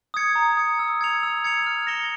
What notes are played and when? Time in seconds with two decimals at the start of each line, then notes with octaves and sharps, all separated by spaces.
0.14 D#6 G#6 C#7
0.35 A#5
0.57 D#6 G#6 C#7
0.79 E6
1.01 G#6 C#7 F7
1.23 E6
1.44 G#6 C#7 F7
1.66 F6
1.87 A#6 C#7 E7 G7